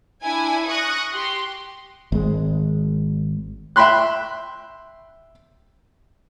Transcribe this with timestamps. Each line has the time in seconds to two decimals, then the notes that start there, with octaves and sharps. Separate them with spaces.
0.22 D4 E4 G#5
0.67 C#6 D#6 F#6 A#6
1.13 G4 C6
2.12 G#1 G#3
3.76 E5 G5 B5 C6 F#6